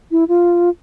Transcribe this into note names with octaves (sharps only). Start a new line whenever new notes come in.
E4
F4